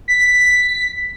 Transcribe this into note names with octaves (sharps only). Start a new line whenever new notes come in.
B6